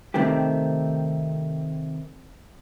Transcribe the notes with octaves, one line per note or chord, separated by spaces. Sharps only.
C3 D#3 A3 C4 G4